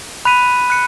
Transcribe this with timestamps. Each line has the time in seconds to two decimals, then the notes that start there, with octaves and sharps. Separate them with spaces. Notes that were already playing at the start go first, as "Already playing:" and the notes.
0.25 B5 F#6 B6 D#7
0.70 F#6 C#7